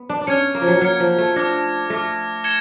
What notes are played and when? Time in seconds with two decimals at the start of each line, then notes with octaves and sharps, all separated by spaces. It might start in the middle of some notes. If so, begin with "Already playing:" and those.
Already playing: B3
0.09 D4
0.21 D4
0.27 C#4 F6 G#6 C#7
0.55 A#3
0.62 F3
0.68 F#3
0.81 F#3 F6 G#6 C#7
1.00 F3
1.18 A3
1.36 D4 D6 F6 A#6
1.90 A3 D6 F6 A#6
2.44 G#6 C#7 E7 G7